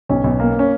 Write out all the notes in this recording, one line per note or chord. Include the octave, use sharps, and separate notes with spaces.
B1 C#4
B1
A#3
C#4